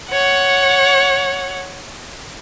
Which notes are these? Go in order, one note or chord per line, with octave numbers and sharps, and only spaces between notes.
C#5 F#5